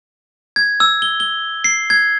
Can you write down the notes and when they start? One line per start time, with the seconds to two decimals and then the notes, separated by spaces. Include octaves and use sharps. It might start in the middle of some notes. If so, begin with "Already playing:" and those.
0.56 G#6
0.80 E6
1.02 G7
1.20 G7
1.64 C7
1.90 G#6